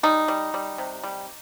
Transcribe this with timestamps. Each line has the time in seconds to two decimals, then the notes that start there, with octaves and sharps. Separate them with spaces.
0.03 G3 D#4
0.28 G3
0.54 G3
0.78 C3
1.04 G3